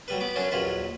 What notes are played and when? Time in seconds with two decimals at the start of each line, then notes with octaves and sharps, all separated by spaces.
0.08 F#3 G3 B4
0.20 B3 B5 D6
0.36 F#2 F#3 C#4 D4
0.51 A#1 D#2 F#3 F4 B4 B5